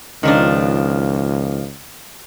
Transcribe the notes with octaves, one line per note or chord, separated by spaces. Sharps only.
C#2 D#3 F3 D4